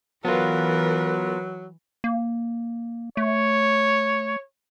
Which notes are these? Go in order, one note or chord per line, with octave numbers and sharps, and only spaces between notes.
E3 F#3 B3 F4 A#4 B4
A#3
A3 C#5